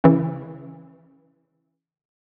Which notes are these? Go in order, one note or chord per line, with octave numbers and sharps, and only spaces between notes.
C#3 E3